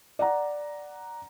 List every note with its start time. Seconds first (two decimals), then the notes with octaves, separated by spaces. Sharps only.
0.19 D5 F#5 A#5